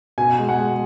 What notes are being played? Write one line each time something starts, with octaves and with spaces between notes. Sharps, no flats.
B2 G#5
G#3
F#5
G#3